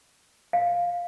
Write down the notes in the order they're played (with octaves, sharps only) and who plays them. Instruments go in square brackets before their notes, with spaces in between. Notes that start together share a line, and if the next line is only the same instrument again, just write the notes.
[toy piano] F5